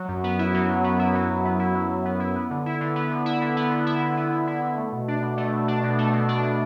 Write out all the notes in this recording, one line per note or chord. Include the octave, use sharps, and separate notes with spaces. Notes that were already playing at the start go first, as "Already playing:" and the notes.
Already playing: F#3
F#2
B3
E4
F#3
F#2
B3
E4
F#3
F#2
B3
E4
F#3
F#2
B3
E4
B3
D3
E4
D3
B3
D3
E4
D3
B3
D3
E4
D3
B3
D3
E4
D3
A3
B2
D4
B2
A3
B2
D4
B2
A3
B2
D4
B2